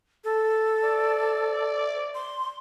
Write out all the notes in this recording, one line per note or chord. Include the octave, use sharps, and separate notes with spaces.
A4
D5
C6